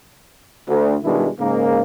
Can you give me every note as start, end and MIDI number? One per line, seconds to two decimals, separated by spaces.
0.68 0.96 38
1.04 1.29 47
1.04 1.29 51
1.04 1.29 55
1.04 1.29 56
1.04 1.29 62
1.04 1.29 64
1.40 1.83 44
1.40 1.83 49
1.40 1.83 58